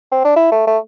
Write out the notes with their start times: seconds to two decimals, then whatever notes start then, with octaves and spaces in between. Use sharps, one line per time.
0.12 C4
0.25 D4
0.36 E4
0.52 A3
0.67 A3